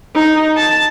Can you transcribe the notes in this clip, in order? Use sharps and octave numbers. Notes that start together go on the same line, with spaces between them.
D#4
A5